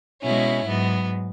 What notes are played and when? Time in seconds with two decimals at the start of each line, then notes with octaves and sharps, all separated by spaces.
0.22 B2 G#3 C#4 E4
0.66 G#2 F#3 B3